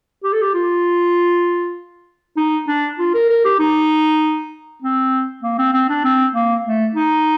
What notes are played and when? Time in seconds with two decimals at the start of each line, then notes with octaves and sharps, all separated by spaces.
0.24 G4
0.33 A4
0.41 G4
0.54 F4
2.37 D#4
2.68 D4
2.99 F4
3.14 A#4
3.30 A#4
3.45 G4
3.59 D#4
4.82 C4
5.43 A#3
5.58 C4
5.73 C4
5.89 D4
6.05 C4
6.34 A#3
6.65 A3
6.95 D#4